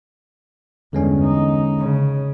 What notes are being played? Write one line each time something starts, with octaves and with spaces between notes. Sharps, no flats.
E2 G2 D3 G#3 C#4
D#4
C#3